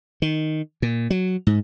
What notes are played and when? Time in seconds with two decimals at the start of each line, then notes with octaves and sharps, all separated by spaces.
0.22 D#3
0.82 A#2
1.10 F#3
1.47 G#2